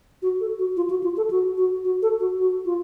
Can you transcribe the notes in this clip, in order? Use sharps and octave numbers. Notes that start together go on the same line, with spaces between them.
F#4
A4
F#4
F4
F#4
F4
A4
F#4
F#4
F#4
A4
F#4
F#4
F4